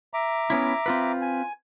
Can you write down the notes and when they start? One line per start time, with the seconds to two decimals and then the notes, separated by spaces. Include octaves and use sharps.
0.14 E5 A#5 D6
0.50 B3 C#4 E4
0.86 C4 F4 B4
1.21 G#5